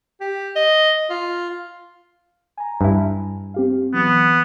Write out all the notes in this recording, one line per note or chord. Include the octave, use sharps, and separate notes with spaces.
G4
D#5
F4
G#5 A#5
G2 E4
C4 G4 F5
E3 F#3 B3